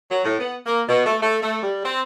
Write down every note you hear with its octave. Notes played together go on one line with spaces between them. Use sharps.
F#3
A2
B3
A#3
B2
A3
A3
A3
G3
C4